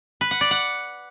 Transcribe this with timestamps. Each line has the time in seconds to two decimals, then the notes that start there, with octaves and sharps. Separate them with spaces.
0.21 B4
0.31 F#5
0.41 D5
0.51 F#5